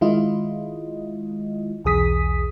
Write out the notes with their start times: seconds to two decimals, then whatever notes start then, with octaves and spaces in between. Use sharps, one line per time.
0.01 D#3 G#3 E4 F4 D#5
1.85 B1 E2 G#4 D#6 B6